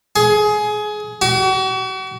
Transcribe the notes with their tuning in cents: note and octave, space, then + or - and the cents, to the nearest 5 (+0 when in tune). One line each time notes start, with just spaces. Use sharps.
G#4 +20
F#4 +40